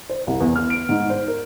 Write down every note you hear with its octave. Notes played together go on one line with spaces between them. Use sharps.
C5
C2
E2
F6
D7
G#2
C5
A#4